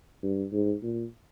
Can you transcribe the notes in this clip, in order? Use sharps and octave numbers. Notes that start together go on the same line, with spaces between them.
G2
G#2
A#2